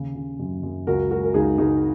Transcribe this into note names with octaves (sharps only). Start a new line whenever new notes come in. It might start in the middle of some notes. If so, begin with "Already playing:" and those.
Already playing: D#2 C#3
C#3
F#2
F#2
C#2 F#4 A#4
G#3 F#4 A#4
A#4
C#2 D#4 G#4
C#2 D#4 G#4